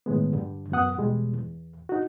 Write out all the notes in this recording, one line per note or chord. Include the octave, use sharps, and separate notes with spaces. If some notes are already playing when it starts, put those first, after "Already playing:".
A2 D#3 G#3 B3
G2 D3 G3
F#2 B3 F#5 D#6
E2 B2 G3 G#3
E2
D#4 F#4